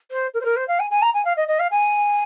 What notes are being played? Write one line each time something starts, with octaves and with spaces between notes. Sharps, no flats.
C5
A#4
C5
A#4
C5
F5
G#5
G#5
A#5
G#5
F5
D#5
D#5
F5
G#5